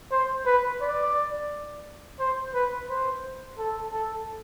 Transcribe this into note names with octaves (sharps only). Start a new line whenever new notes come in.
C5
B4
D5
C5
B4
C5
A4
A4